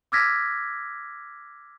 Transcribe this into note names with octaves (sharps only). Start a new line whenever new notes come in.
D6 E6 F6 G#6 A#6 B6